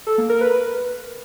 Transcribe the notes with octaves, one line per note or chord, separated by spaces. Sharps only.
A4
A#3
A#4
B4